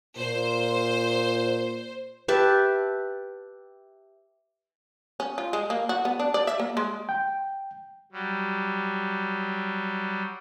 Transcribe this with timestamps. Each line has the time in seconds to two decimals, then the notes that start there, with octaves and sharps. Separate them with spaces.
0.18 A#2 C5
2.28 G4 B4 E5 A5
5.20 C#4
5.38 F4
5.53 G#3
5.70 A#3
5.89 F#4
6.05 B3
6.20 D4
6.34 D5
6.47 E5
6.60 A#3
6.77 G#3
7.09 G5
8.12 F#3 G3